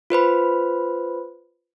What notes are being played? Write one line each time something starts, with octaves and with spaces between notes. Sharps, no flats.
F4 B4 C5 B5